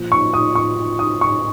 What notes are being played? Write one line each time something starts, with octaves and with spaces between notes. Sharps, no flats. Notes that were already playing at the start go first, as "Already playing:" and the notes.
Already playing: A#2 F3
C#6
D#6
C#6
D#6
C#6